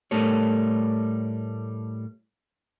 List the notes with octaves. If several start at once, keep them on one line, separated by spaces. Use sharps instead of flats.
A2 G3 A3 A4 A#4 C#5